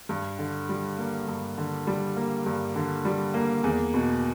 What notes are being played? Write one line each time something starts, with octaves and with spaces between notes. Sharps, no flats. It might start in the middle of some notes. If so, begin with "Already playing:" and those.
G2
D3
G3
A#3
G2
D3
G3
A#3
G2
D3
G3
A#3
E2
B2